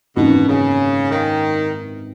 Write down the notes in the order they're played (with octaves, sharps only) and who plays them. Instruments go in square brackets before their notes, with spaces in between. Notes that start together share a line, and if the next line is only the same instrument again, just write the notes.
[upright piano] G#1 F#2 E3 A#3 D#4 [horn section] B2
[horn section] C#3
D#3